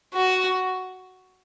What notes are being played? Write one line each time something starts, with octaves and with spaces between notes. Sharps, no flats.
F#4